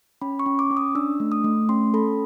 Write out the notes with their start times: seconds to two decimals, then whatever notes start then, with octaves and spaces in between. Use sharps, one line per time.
0.22 C#4 B5
0.39 C#6
0.46 C#4
0.59 D6
0.71 C#4
0.77 D#6
0.95 D4 E6
1.20 A3
1.32 D#6
1.44 A3
1.69 C#4 C6
1.94 A4 B5